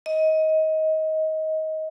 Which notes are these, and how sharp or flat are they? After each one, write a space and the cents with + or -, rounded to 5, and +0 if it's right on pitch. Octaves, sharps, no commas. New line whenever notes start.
D#5 +20